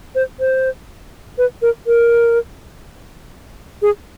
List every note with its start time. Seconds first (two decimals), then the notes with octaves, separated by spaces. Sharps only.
0.15 C5
0.40 C5
1.38 B4
1.62 A#4
1.87 A#4
3.82 G#4